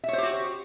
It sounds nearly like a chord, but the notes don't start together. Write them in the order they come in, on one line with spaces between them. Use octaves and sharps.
E5 C#5 C5 G4 F#4